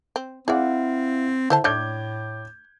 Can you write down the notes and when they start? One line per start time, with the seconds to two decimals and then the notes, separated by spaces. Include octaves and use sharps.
0.16 C4
0.48 C4 E4 G#4 D5 F5 F#5
1.50 D3 E4 C5 A5
1.64 A2 A3 D4 C#5 D6 G6 G#6